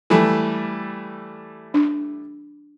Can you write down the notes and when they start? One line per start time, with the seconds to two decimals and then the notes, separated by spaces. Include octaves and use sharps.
0.10 E3 G3 A3
1.74 D4